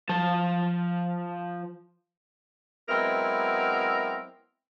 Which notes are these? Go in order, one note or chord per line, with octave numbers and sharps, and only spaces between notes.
F3 A5
F#3 G#3 B3 C4 E4 A#4